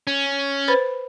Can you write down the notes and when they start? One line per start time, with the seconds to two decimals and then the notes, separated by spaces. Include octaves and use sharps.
0.07 C#4
0.68 B4 C5 B5